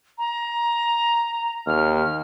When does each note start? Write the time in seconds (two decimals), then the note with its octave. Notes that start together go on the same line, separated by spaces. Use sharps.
0.18 A#5
1.67 D#2 F6